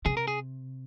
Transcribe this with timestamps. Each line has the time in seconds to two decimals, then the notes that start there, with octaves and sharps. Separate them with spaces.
0.06 C3 G#4
0.17 A#4
0.28 G#4